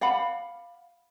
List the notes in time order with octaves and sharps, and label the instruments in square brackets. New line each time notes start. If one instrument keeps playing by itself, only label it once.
[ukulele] D5 F5 F#5 B5